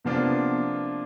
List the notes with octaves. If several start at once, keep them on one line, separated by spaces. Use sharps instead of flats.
C3 F3 A#3 B3 D4 F4